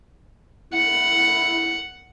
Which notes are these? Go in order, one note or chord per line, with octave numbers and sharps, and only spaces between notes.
E4 F#5